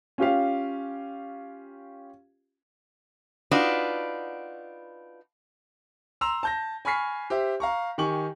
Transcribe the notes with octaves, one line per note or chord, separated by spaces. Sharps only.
C#4 F4 G4 F5
D4 D#4 F4 F#4 B4
A#5 C6 E6 E7 F7
A5 G6 A#6
G#5 B5 C#6 F6 B6 C7
G4 C5 E5
F5 A#5 C#6
D#3 G4 G#5 C#6 F#7